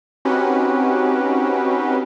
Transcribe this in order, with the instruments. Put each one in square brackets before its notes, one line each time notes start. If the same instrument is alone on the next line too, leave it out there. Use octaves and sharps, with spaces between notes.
[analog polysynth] C4 C#4 D#4 F#4 G4 B4